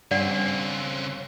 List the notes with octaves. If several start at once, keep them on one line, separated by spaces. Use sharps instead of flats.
G2 C#3 C4 D5 F#5